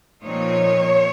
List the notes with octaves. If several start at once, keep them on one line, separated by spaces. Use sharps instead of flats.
A#2 F3 C4 D#4 C#5